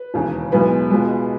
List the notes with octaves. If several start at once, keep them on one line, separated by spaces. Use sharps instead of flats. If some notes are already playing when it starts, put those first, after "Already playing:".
Already playing: B4
E1 D#2 C#3 E3
B1 A2 G#3 B3 B4
C#2 B2 G#3